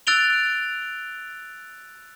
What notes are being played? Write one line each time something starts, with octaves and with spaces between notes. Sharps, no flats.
E6 F#6 A6 D7 F7 G7